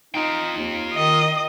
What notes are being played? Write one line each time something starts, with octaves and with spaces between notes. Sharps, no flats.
D#4 F4 G5
D#2
D#3 D#5